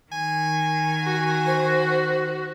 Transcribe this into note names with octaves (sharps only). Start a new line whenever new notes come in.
D#3 G#5
F#4
C5